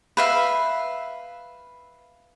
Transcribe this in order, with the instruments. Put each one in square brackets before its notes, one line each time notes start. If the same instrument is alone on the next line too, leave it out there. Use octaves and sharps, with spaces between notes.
[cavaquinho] B4 E5 F5